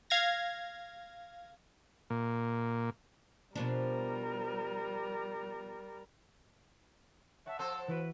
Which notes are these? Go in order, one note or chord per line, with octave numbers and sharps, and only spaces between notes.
F5 G#6 A#6
A#2
B2 F3 G3 D4 A#4
C#5 E5 F#5 A5
F3 A4 C5 E6
E3 E4 F#4 B4